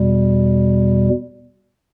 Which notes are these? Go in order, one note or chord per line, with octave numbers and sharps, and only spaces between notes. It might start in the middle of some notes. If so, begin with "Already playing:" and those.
Already playing: E2 B2 G3